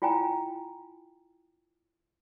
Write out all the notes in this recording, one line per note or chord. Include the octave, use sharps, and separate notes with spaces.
E4 F4 G5 G#5 A#5